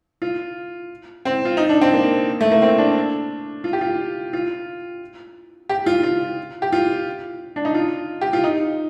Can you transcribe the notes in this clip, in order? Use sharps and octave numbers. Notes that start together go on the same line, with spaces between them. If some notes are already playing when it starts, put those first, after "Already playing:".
F4
C4
F4
D#4
D4
C4
A#3
A3
A#3
C4
D4
F4
G4
F4
F4
G4
F4
F4
G4
F4
D4
D#4
F4
G4
F4
D#4